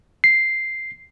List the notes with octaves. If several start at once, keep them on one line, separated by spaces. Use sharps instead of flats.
C7